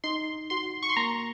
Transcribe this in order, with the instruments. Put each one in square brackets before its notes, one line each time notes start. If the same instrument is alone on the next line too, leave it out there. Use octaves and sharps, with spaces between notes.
[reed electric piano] D#4 [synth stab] C6
[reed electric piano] F#4 [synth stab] C6
[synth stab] C#6
C6
[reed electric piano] A#3 [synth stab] A#5